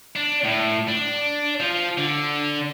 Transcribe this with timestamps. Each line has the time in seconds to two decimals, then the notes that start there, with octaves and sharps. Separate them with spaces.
0.16 D4
0.44 A2
0.88 D4
1.60 F3
1.98 D3